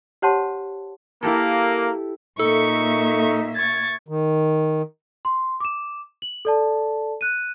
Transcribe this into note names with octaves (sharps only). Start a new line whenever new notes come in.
G4 C5 C#5 F#5 A5 C6
A#3 E4 G4 A4
A#2 A#3 D#4 A4 E5 C#6
C#6 G#6 A6
D#3
C6
D6 E7
F#7
A4 D5 A5
F#6 D#7